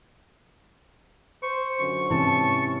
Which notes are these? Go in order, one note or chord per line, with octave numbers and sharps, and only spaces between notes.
C5 C#6
C#2 F#2 D3 C#6
G#2 C3 E3 C#4 A5